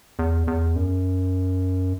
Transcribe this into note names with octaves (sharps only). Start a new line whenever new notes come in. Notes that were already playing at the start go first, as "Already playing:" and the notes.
E2
E2
F#2